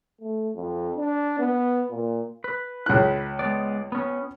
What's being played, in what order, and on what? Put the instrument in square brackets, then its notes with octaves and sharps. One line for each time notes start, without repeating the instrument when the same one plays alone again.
[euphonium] A3
F2
D4
B3
A#2
[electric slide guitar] B4
[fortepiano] C#2 F#6
[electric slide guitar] G#3 B3 D5
B3 C#4